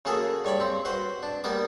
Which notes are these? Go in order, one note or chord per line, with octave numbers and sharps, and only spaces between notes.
C#3 A#3 F#4 G#4 A4
G2 C#5 D5 B5
C4
F#4 B4 C5
D4
G3 A#3 B3 D6